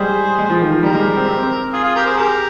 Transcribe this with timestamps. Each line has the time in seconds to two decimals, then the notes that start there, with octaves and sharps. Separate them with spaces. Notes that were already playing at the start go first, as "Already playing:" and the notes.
Already playing: G3 G#3 G#4 C5
0.39 G#3
0.50 F3
0.61 D#3
0.72 F3
0.83 G3 G4 A#4
0.94 G#3
1.17 C4
1.28 C4
1.43 C4
1.72 F4 G#4
1.83 F4 G#4
1.95 G4 A#4
2.06 G#4 C5
2.17 G4 G#4 A#4